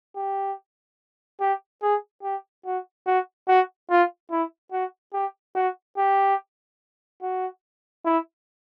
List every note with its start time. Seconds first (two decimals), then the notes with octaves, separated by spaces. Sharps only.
0.16 G4
1.41 G4
1.82 G#4
2.23 G4
2.66 F#4
3.06 F#4
3.48 F#4
3.90 F4
4.31 E4
4.72 F#4
5.13 G4
5.55 F#4
5.98 G4
7.22 F#4
8.05 E4